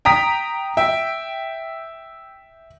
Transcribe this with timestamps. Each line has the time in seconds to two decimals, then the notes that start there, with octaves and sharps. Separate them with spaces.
0.05 G5 A#5 D#6 B6
0.77 E5 G5